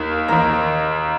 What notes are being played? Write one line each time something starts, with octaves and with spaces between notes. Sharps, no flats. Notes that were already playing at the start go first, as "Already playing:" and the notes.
Already playing: D#2 D#3 A#3
D#2 D#3 A#3 A#5